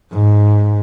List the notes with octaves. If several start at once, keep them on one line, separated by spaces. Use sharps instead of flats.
G#2